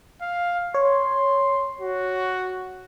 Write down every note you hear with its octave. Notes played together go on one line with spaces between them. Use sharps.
F5
C#5 C6
F#4